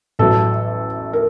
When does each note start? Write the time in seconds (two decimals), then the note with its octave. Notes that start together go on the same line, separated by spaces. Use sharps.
0.19 A1 A2 F#3 A4
1.13 A#4